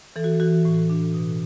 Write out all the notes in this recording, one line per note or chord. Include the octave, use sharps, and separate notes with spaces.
E3 A4
F#4
E3 F#4
A2
D4
B2